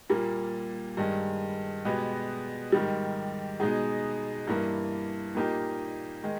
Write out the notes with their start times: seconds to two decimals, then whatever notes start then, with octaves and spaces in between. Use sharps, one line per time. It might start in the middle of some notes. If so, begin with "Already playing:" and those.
0.10 A#2 G3 A#3
0.97 G2 D#3 G#3
1.85 B2 G#3 B3 G4
2.72 G#2 D#3 G3
3.60 B2 G#3 D#4 G#4
4.47 G2 E3 A#3
5.35 A#2 A#3 D#4 G4
6.23 D#3 G#3